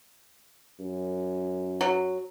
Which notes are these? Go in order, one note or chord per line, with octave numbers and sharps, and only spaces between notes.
F#2
F#3